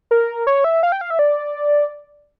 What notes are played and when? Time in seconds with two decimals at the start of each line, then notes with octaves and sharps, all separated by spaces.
0.11 A#4
0.47 C#5
0.64 E5
0.83 F5
0.92 G5
1.01 F5
1.10 E5
1.19 D5